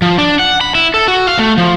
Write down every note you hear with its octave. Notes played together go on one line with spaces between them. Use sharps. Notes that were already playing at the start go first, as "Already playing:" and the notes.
F3
D4
F#5
B5
E4
A4
F#4
F5
A3
F3